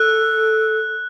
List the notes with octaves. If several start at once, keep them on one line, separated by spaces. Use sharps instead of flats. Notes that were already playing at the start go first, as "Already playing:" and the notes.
Already playing: A4 F#6